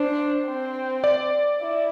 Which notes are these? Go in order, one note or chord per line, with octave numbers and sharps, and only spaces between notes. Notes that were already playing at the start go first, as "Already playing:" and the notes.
Already playing: D4 C5
C4
D5
E4